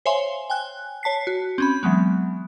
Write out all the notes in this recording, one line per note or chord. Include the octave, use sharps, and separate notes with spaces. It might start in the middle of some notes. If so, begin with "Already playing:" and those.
C5 C#5 E5 F5 G#5 C6
G5 G#5 F#6
C#5 A5 B6 C7
F#4
C4 C#4 B5
E3 F#3 G#3 B3